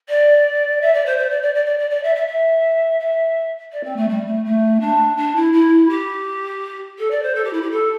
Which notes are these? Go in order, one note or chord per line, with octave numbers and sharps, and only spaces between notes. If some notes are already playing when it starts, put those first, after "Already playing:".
D5
E5
D5
C5
C5
D5
D5
D5
D5
D5
D5
E5
E5
E5
E5
D5
C4
A3
G3
A3
A3
D4
D4
E4
E4
G4
A4
D5
C5
A4
G4
E4
G4
A4